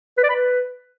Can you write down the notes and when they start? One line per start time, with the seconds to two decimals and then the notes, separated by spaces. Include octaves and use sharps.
0.17 B4
0.23 D5
0.29 B5
0.35 B4